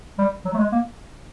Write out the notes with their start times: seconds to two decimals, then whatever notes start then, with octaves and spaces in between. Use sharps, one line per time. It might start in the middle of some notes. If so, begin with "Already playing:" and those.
0.18 G3
0.45 F#3
0.54 A3
0.59 G#3
0.72 A#3